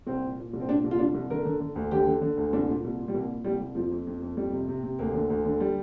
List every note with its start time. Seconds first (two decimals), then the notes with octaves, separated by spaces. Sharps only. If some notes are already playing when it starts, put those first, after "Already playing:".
0.07 C2 C4
0.23 A#2
0.38 A#2
0.53 C2
0.60 C4
0.68 A#2 D4
0.84 C2
0.91 F4
0.99 C2 D4
1.14 C2
1.30 D3 A#4
1.45 D3
1.60 D3
1.76 D2
1.91 D3 G4
2.07 D3
2.22 D3
2.37 D2
2.53 C2 D4
2.69 A#2
2.84 C2
2.99 A#2
3.08 G3
3.14 C2 A#3
3.29 A#2
3.44 C2 G3
3.61 C2
3.75 F2 F3
3.91 F2
4.07 F2
4.22 F2
4.37 F2 G3
4.52 C3
4.68 C3
4.83 C3
4.99 D2 A#3
5.13 D3
5.30 D2
5.45 D3
5.60 G3